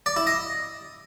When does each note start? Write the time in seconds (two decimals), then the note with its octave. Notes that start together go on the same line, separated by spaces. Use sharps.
0.06 D5
0.16 E4
0.27 D#5